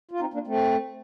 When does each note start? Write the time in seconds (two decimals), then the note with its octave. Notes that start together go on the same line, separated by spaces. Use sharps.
0.11 F4
0.20 C4 D#4
0.34 A#3 D4
0.47 A3 C4